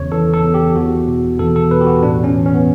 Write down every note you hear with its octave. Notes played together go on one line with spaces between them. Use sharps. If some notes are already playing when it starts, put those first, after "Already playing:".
Already playing: E2 C#3 C#5
E3 A4
A4
E2
G4
E2 F#4
B2
E2 A4
A4
B2 B4
G4
F#4
A2 D4
C#4
E3
C#4
B3